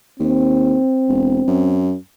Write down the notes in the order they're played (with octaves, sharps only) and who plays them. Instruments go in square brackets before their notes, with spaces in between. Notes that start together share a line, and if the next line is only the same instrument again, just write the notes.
[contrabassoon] D#2 [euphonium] C4
[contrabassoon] E1
F#2